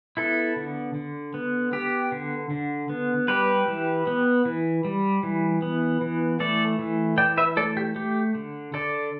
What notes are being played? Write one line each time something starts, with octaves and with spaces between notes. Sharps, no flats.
B3 E4 A4
D3
D3
B3
B3 G4
D3
D3
B3
G3 G4 B4
E3
B3
E3
G3
E3
B3
E3
A3 A4 D5
E3
E3 D5 G5
B4 E5
A3 A4 D5
G4
A3 G4
D3
D3 A4 D5